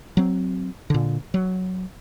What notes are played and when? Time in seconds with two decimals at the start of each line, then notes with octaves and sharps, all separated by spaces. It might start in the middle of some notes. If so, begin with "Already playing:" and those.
0.17 F#3 C4
0.90 A#2 D3
1.34 F#3